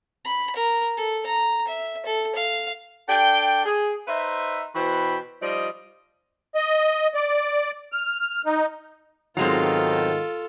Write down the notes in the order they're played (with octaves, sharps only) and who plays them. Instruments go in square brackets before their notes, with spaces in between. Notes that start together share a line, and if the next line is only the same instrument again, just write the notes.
[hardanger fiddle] B5
A#4
A4
A#5
E5
A4
F5
[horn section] D4 A4 D5 G5
G#4
D#4 B4 C5 E5
B2 E3 F#4 C5 G5 B5
F3 G3 D#4 D5 D#5
[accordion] D#5
D5
F6
D#4
[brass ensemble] G#2 B2 D#3 [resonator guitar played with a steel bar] F#3 G#3 C4 [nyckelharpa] F4 A4